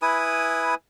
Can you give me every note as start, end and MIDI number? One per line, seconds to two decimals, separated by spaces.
0.02 0.75 64
0.02 0.75 71
0.02 0.75 80
0.02 0.75 87